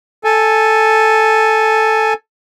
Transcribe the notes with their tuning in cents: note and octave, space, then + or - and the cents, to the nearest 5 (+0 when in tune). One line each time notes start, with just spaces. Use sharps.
A4 +0 G#5 +0